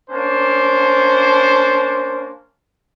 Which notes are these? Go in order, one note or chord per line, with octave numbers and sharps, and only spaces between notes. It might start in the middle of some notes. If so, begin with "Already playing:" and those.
A#3 C#4 D4 C5